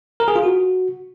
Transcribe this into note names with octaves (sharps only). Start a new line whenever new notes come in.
A#4
G#4
F4
F#4